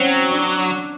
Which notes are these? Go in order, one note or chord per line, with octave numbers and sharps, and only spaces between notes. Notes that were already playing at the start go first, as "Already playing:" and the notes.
Already playing: F#3 C4 C#4
D4